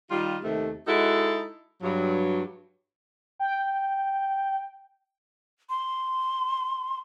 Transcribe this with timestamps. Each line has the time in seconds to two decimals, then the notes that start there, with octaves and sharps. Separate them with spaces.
0.11 D#3 G3 F4
0.44 D#2 C3 D#3 A3
0.87 G#3 D#4 E4 F#4 A4
1.82 G2 F#3
3.39 G5
5.70 C6